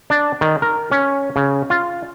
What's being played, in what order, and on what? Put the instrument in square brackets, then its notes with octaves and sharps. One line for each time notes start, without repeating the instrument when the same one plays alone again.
[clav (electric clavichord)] D4
D#3
A#4
C#4
C#3
F4